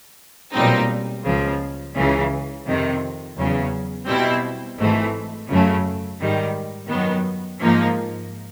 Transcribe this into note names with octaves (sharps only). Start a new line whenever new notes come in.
B1 A#2 G3 C4 D#4
C#2 C#3 F3
C#2 C#3 E3
F2 C3 D#3
E2 C#3 F#3
B2 G3 C4 E4
G#1 G#2 E3 A3
F#2 C#3 F#3 A3
G#2 D#3 G3
F#2 D#3 F#3 B3
G#2 F3 A#3 D#4